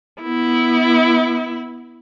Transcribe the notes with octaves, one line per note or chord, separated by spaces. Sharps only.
B3 E4